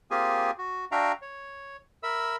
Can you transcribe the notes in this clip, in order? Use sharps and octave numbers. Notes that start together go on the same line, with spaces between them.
A#3 C4 F4 G4 G#4 G#5
F#4
D4 F#4 E5 F5 G5 A#5
C#5
A#4 E5 B5 E6